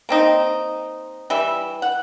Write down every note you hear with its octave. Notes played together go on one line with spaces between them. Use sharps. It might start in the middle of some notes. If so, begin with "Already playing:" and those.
A#3 C4 D#4
E3 G3 E5
F#5